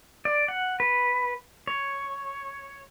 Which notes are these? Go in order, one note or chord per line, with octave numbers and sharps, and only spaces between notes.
D5
F#5
B4
C#5